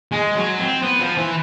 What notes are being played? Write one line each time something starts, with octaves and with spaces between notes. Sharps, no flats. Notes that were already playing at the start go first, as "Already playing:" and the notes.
G#3
F#3
C4
B3
F3
E3